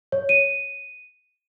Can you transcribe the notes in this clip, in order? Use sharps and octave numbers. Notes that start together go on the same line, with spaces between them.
C#5
D#7